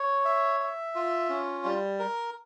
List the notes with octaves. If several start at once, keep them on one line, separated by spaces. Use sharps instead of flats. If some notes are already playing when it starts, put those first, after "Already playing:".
Already playing: C#5
E5
E5
F4
C#4
G3
A#4